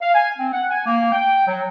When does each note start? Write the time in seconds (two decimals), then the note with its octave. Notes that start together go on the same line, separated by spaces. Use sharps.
0.02 F5
0.15 G#5
0.38 C4
0.53 F#5
0.71 G#5
0.86 A#3
1.12 G5
1.47 F#3